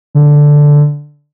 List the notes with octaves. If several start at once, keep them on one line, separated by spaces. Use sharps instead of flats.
D3